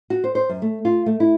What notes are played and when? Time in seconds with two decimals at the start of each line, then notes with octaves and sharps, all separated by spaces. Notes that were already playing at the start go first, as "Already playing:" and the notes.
0.10 F#4
0.24 C5
0.35 C5
0.49 F#2
0.62 A3
0.85 F4
1.06 A3
1.20 E4